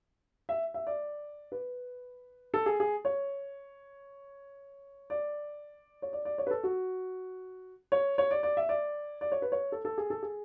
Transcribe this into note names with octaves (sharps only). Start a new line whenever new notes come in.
E5
E5
D5
B4
A4
G#4
G#4
C#5
D5
C#5
D5
D5
C#5
B4
A4
F#4
C#5
C#5
D5
D5
E5
D5
D5
C#5
B4
C#5
A4
A4
G#4
A4
G#4